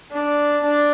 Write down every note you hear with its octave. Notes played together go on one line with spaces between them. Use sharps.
D4
D4